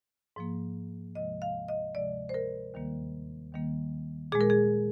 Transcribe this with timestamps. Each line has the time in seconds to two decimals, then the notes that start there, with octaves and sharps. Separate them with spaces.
0.36 G#2 F3 A#3
1.15 D2 C3 F3 G#3 D#5
1.42 F5
1.68 D#5
1.95 D2 C3 F3 G#3 D5
2.29 C5
2.34 A#4
2.74 D#2 D#3 G3 A#3
3.53 D#2 D#3 G3 A#3
4.32 A#2 G#3 G#4
4.41 A#4
4.50 G#4